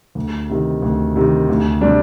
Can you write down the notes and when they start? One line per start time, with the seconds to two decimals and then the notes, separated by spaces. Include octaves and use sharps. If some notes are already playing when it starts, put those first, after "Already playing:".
0.15 D2
0.49 C3 D#3
0.82 D2
1.16 C3 D#3
1.49 D2
1.81 C3 G3 D4